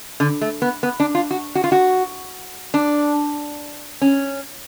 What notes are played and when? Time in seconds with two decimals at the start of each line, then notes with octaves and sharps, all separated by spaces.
0.20 D3
0.41 A3
0.62 B3
0.83 B3
1.00 D4
1.15 F4
1.31 F#4
1.55 F#4
1.64 F4
1.72 F#4
2.74 D4
4.01 C#4